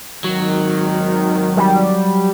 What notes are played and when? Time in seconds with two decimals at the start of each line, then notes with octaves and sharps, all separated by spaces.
0.24 G#1 D#3 F#3
1.57 G3